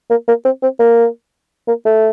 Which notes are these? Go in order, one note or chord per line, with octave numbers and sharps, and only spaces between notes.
A#3
A#3
C4
C4
A#3
A#3
A3